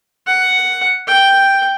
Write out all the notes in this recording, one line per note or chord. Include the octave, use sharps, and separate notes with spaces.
F#5
G5